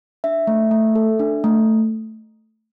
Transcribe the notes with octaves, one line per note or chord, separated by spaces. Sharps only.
D4 E5
A3
A3
A4
D4
A3